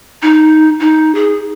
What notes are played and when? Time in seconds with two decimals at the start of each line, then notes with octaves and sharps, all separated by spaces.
0.22 D#4
0.80 D#4
1.15 G#4